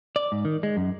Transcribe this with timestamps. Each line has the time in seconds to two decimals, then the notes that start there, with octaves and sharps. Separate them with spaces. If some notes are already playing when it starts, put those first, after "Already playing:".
0.16 D5
0.32 G#2
0.45 D#3
0.63 G#3
0.77 F#2